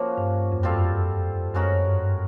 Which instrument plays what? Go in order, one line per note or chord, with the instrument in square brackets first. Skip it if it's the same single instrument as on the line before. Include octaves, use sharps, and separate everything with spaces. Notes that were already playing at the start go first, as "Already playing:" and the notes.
Already playing: [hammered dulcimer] F3 A#3 C#4 F#4
[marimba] G2
F2
[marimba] F#2 [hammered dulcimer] G3 C4 F4 A4
[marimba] F#2 [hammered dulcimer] G#3 C#4 F#4 A#4
[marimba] G2